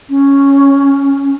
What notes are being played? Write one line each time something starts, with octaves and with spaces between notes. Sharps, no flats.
C#4